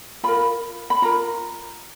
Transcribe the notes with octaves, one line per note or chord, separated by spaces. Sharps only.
F4 A#4 B5
B5
F4 A#4 A#5